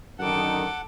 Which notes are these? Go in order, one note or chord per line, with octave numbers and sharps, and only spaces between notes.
F#2 D3 D#3 A4 F#5 D6